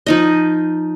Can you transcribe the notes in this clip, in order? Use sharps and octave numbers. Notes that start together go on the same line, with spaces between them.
F3 D#4 D#5